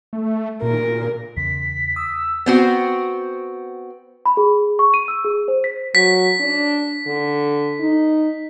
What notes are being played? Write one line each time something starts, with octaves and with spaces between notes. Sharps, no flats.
A3
A#2 A#4
E2 C#3 B6
D#6 E6
B3 C4 F#4
B5
G#4
C#6
D#7
E6
G#4
C5
B6
F#3 B6
D4
D3
D#4